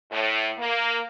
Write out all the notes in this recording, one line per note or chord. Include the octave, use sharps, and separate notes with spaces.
A2
A#3